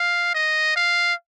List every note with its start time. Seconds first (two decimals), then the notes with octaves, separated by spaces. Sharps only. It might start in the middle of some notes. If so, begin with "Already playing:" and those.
Already playing: F5
0.34 D#5
0.76 F5